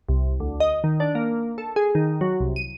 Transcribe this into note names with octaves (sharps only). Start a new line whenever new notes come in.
C2
D2
D#5
D#3
D4
A#3
A4
G#4
D#3
F#3
C2
D#7